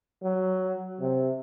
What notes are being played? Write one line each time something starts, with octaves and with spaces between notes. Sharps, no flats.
F#3
C3